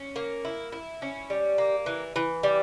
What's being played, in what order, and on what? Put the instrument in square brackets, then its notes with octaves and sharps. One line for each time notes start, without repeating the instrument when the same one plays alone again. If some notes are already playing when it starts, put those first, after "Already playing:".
Already playing: [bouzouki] C#4
A#3
E4
E4
C#4
G3
A#3
E3
E3
G3